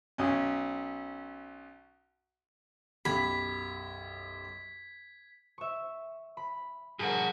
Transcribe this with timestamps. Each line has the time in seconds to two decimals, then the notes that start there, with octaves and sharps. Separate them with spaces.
0.18 B1 C#4
3.05 B1 F#2 G4 B5 G#6 B6
5.58 E5 C#6
6.37 B5
6.99 G2 F#4 G#4 A#4